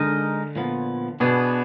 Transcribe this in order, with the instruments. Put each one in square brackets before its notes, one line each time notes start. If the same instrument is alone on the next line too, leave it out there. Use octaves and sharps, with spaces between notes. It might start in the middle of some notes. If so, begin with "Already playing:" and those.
Already playing: [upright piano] D3 [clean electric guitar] G#3 D#4 A#4 D#5
[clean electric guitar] A#2 F3 B3
[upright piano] B2 [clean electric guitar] B3 D4 G#4